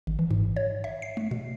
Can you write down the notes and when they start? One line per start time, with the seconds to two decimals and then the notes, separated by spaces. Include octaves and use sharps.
0.07 G#1
0.19 E3
0.31 G#2
0.56 C#5
0.84 E5
1.02 C7
1.17 A3
1.31 B2